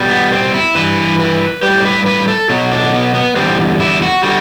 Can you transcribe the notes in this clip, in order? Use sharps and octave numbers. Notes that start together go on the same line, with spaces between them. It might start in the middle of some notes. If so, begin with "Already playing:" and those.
Already playing: B2 G3
B3
C4
E4
G2 E3 B4
B4
A2 G3 G4
C5
B4
B4
A4
B2 F#3 F#4
D4
B3
B3
E2 D3 G3 C4
E4
F#4
D3 G3 F#4